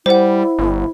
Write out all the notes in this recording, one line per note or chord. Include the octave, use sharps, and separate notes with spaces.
G3 E4 C5 F#5
G1